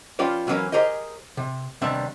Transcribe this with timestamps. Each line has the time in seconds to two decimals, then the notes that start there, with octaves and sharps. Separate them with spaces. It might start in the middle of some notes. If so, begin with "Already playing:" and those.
0.19 F3 C#4 F4 G4 B4 D5
0.47 E3 F#3 A#3 C#4 A#4 B4
0.72 G4 G#4 A#4 C5 D#5
1.37 C3
1.81 D#2 C3 G3 B3 D4 E5